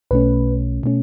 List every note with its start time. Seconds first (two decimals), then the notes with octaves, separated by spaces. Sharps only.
0.11 B1 B2 A3 C#4 B4
0.83 B2 A3 C#4